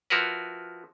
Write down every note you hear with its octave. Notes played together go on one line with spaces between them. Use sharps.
F3 E4 F#4 A#4 B4